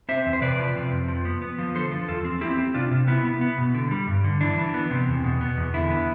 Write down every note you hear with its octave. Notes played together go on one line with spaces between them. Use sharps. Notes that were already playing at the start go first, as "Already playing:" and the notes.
C4 C5 E5
E2
C5
C3 B4 D5
F3
C3
F2
F3
B3
B3
F3
D3 A4 C5
F3
E2 F4 A4
C4
C4 E4 G4
C4
C3 D4 F4
C3
B3 E4
B3
B3
B2
D3
G3
G2
D3
E3 D4
E3
B3
C3
E2
B2
B3
E2
D3 E4
B3